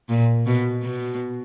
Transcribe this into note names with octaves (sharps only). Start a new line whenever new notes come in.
A#2
B2
B2